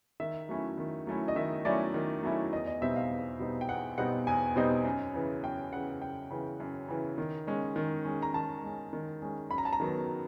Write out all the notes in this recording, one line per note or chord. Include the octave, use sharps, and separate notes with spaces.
D#3 E5
F#3 A3 C#4 E4
D#3
F#3 A3 C#4 E4
D#5
D#3 E5
F#3 A3 C#4 E4 D5
D#3
F#3 A3 C#4 E4
E2 D#5
D#5
B2 G3 C4 D#4 E5
F5
E2
B2 G3 C4 D#4
G5
E2 F#5
B2 G3 C4 D#4 F#5
E2 G#5
B2 G3 C4 D#4
F#2
C#3 E3
F#2 G5
C#3 E3 F#5
F#2 G5
C#3 E3
F#2
C#3 E3
D#3
G#3 C#4
D#3
G#3 C#4
A#5
D#3 A5
G#3 C#4
D#3
G#3 C#4
F#2 B5
A#5
A5
A#5
D#3 F#3 B3